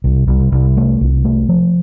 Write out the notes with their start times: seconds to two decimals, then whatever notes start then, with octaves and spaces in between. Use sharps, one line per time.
0.04 C2
0.28 C2
0.52 C2
0.77 A3
1.01 C2
1.25 A3
1.49 F3